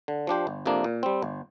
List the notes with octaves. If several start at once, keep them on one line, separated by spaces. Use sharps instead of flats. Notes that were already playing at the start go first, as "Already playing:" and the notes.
D3
F3 D4 G4 C5
G1
F2 C3 A#3 D4
A#2
G3 C4
G1